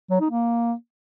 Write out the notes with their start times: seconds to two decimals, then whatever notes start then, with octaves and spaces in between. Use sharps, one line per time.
0.10 F#3
0.20 D#4
0.30 A#3